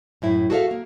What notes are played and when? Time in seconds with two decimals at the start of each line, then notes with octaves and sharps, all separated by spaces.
0.22 F#2 A2 E4
0.50 F#4 G#4 A4 D5 E5 F5
0.71 A#3